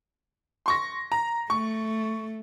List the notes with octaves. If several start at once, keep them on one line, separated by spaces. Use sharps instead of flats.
C6 C#6 A#6
A#5
A3 C#6